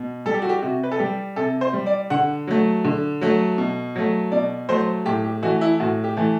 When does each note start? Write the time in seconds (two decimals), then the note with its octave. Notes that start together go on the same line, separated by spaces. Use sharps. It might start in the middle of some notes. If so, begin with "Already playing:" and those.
Already playing: B2
0.26 G3 A4
0.34 G4
0.42 F#4
0.49 G4
0.62 C3 F#4
0.83 B4
0.91 A4
0.99 G3 G4
1.36 C3 A4
1.61 C5
1.73 G3
1.86 D5
2.10 D3 F#5
2.47 F#3 A3
2.85 D3
3.21 F#3 A3
3.58 B2
3.96 F#3 A3
4.32 B2 D5
4.69 F#3 A3 C5
5.06 A2 G4
5.24 G4
5.43 E3 A3 F#4
5.61 E4
5.80 A2 F#4
6.04 G4
6.17 E3 A3